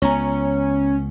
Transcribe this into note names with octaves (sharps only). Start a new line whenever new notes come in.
C#2 B3 C#4 C#5 G#5 A#5